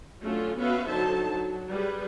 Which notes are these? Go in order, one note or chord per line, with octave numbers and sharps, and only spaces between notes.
F#3 A3 C#4 D4 F4
B3 C#4 F#4 B4 E5 F5
D3 F#3 D#4 C5 A5
F#3
G3 G#4 B4